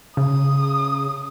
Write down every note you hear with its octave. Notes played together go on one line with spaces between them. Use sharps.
C#3 D#6